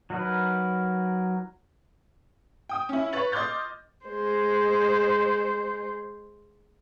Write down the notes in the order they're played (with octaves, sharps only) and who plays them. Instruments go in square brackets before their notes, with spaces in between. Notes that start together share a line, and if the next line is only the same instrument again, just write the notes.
[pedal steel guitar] F#3 D#4 A#4 B4
[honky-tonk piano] G5 D#6
C#4 E4
B4 C#5 A6 F#7
D#5 C6 D6 F6 G6 A6
[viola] G#3 C5